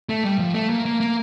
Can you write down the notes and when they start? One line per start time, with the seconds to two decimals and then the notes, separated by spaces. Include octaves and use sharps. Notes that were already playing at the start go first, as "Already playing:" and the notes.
0.09 A3
0.24 G3
0.39 F3
0.54 A3
0.70 A#3
0.85 A#3
1.00 A#3